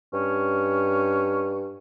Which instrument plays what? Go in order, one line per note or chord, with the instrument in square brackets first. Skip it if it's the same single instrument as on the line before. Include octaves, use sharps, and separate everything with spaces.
[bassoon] G2 [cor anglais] C#4